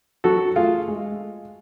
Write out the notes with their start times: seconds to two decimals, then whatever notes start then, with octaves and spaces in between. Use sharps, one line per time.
0.24 F#3 F#4 A4
0.56 A3 F4 G#4
0.88 G#3